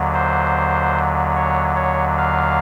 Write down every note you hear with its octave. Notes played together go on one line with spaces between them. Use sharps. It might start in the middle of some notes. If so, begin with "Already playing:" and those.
Already playing: D#2 D3 F#3
C5
C#5
C#5
F5